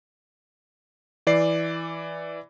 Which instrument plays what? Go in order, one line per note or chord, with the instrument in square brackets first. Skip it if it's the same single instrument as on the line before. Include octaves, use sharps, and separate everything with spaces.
[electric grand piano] E3 D5 C7